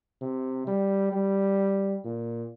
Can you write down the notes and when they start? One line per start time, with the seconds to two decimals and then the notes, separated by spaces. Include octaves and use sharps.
0.21 C3
0.67 G3
1.12 G3
2.04 A#2